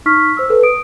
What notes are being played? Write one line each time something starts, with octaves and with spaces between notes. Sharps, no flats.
D#4 C#6 F6 B6
C5 E6
A4 B4
D#6 D7